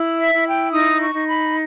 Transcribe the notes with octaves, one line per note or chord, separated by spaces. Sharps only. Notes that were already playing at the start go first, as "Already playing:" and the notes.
Already playing: E4
E5
E4
G5
D#4 D#6
C#6
D#4
B5